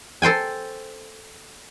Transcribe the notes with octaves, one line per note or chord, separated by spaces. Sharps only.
A4 C5 G5 G#5